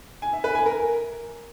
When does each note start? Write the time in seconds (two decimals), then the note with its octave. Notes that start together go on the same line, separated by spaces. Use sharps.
0.22 G#5
0.33 E5
0.44 B4
0.55 G#5
0.66 A#4